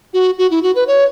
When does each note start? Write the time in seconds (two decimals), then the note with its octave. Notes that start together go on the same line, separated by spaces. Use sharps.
0.14 F#4
0.38 F#4
0.51 E4
0.63 F#4
0.75 B4
0.88 C#5